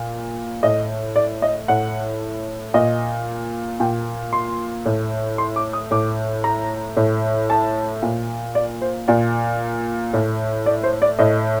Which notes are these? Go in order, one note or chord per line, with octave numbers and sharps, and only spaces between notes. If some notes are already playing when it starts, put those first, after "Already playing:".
Already playing: A#2
A2 D#5
D5
D#5
A2 F#5
A#2 D#5
A#2 G5
C6
A2
C6
D6
D#6
A2 D6
A#5
A2
A5
A#2
D5
C5
A#2 D5
A2
D5
C5
D5
A2 D#5